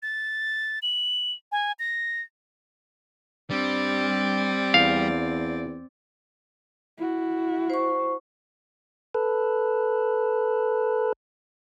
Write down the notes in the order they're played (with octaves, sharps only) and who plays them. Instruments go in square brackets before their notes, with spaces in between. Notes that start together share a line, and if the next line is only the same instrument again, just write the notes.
[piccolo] A6
F#7
G#5
A#6
[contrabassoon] G2 [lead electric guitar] G3 [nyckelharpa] C4 D5
[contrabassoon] E2 [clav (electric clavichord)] F5
[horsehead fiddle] E4 F#4
[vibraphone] C5 C#6
[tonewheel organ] A4 B4